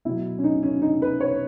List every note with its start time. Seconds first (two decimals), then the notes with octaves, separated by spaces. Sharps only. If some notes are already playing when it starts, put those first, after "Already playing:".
0.05 B2 F#3 E4
0.38 C#4
0.44 D#4
0.63 C#4
0.82 D#4
1.02 B4
1.20 C#5